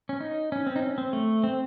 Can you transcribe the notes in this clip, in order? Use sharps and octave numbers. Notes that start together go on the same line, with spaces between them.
C#4
D#4
C#4
C4
D#4
C#4
C4
A3
C4